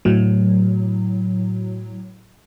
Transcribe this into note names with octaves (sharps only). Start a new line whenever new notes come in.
A2 F#3